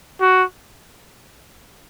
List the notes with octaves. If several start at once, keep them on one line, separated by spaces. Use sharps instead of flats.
F#4